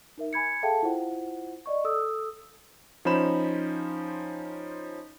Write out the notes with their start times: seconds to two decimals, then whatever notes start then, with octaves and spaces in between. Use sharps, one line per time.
0.18 D#4 A#4 E5
0.33 G#5 B5 G#6 C#7
0.63 G#4 A4 E5 F5 G5 A5
0.83 E4 F4 C5 F#5
1.66 D5 D#5 C#6
1.85 A4 D#6 E6
3.05 F3 C#4 D#4 C5 B5 E7